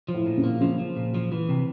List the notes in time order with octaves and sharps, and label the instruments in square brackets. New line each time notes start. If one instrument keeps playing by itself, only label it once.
[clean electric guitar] F3
[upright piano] A2
[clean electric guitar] A#2
[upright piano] C#3
[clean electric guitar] A#3
[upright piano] C#3 [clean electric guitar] F3
[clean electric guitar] F3
A#2
F3
E3
C3